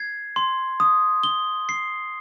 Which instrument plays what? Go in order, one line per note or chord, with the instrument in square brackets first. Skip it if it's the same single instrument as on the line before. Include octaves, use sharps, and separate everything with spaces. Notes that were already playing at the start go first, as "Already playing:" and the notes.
Already playing: [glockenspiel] G#6 C7
C6
D#6
G7
C7